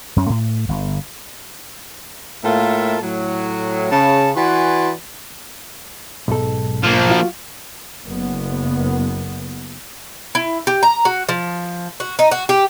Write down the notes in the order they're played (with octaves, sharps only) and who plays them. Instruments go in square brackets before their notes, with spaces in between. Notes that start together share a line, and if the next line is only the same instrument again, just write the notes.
[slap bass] F#2 C#4
A2
G1
[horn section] A2 A#3 F4 A4 A#4 E5
A2 F#3
C#3 A5
E3 F#4 B4 D5 G#5 C6
[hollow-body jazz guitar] B1 G#2 A4
[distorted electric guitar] F3 A#3
[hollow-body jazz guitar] F4 F#4 F5
[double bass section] F#1 B3
[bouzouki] E4
G4
A#5
F#4
F3
F#4
D#4
F#4
G4